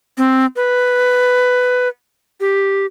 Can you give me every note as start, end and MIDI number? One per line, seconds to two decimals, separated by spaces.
0.18 0.46 60
0.56 1.88 71
2.40 2.86 67